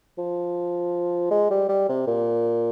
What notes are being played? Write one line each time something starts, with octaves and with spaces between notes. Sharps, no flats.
F3
G#3
G3
G3
C3
A#2